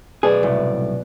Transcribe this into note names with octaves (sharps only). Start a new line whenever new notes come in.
B1 G#4 B4 D5
C2 A2